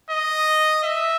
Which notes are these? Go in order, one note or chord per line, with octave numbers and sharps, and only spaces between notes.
D#5
E5